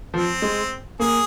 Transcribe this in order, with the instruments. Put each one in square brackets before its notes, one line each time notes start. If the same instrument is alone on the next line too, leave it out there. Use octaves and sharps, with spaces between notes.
[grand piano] F3 [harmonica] C4
[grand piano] G#3
[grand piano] A#3 [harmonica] G#4